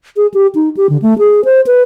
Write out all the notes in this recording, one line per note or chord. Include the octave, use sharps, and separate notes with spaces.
G#4
G4
D#4
G4
D3
A3
G#4
C5
B4